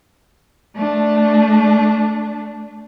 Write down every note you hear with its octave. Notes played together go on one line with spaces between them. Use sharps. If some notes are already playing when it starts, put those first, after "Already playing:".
A3 D4